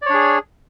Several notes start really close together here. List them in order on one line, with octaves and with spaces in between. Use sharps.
D5 C#5 D4 G#4